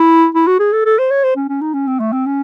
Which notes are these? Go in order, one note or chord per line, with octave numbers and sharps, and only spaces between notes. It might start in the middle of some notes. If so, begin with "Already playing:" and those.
Already playing: E4
E4
F#4
G#4
A4
A4
C5
C#5
C5
C#4
C#4
D#4
C#4
C4
A3
C4
C#4